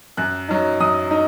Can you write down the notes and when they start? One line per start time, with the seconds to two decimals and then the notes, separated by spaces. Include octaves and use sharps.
0.17 F#2 F#6
0.48 F#3 D#4
0.81 F#2 D#6
1.11 D#4